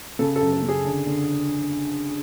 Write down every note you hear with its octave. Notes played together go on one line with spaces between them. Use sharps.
C#3 A4
A4
F#2
A4
C#3
G#4
D3
D3